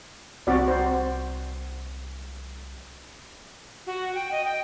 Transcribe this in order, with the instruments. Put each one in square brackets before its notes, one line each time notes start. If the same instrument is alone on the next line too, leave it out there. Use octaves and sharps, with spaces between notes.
[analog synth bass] C2 [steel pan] C4 F#4 D5
[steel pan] C5
[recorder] F#4
G5
D#5
G5